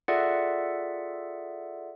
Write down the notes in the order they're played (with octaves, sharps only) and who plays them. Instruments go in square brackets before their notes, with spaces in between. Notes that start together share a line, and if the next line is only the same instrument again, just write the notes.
[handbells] F4 G#4 A4 D5 E5 F#5